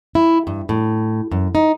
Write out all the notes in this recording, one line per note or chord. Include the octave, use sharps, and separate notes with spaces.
E4
G2
A2
F#2
D#4